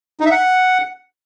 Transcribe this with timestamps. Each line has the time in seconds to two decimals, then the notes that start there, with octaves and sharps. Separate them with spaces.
0.20 D#4
0.26 E5
0.31 F#5